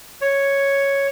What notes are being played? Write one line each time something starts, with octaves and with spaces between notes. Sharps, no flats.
C#5